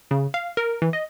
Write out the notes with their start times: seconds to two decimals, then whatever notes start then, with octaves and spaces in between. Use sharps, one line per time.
0.11 C#3
0.34 F5
0.57 A#4
0.82 E3
0.93 D#5